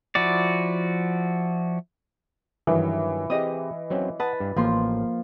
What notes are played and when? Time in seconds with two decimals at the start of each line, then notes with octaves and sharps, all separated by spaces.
0.15 F3 E4 F#4 D5
2.67 G2 D#3 E3 F#3
3.30 C4 G4 G#4 D#5 D#6
3.90 F#3 C4 C#4
4.20 B4 F#5 A5 D#6
4.40 G2
4.56 A1 F3 A#3 C6